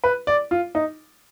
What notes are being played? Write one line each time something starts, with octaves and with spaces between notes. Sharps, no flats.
B4
D5
F4
D#4